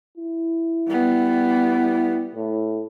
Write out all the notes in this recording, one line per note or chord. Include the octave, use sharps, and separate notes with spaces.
E4
G3 B3
A2